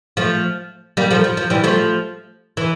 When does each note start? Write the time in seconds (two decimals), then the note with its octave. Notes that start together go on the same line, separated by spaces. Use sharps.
0.17 F3 A3
0.97 G3 A#3
1.11 F3 A3
1.24 F3
1.37 F3
1.50 E3 G3
1.64 F3 A3
2.57 E3